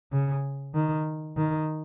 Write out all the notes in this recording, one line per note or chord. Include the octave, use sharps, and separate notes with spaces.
C#3
D#3
D#3